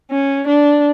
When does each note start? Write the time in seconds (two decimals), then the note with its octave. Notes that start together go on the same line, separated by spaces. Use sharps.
0.11 C#4
0.47 D4